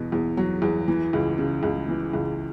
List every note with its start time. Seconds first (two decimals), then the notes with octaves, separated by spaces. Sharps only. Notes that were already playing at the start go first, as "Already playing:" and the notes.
Already playing: E2 B2
0.12 E2
0.37 F#3
0.62 E2
0.88 E3
1.13 C#2
1.38 C#3
1.63 C#2
1.89 E3
2.13 C#2